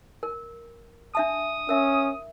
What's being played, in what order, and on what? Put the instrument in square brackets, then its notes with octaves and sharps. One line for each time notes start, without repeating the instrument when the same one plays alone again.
[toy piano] A#4
[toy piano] D4 E5 A5 [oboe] D#6
[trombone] C#4 [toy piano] A#4 E5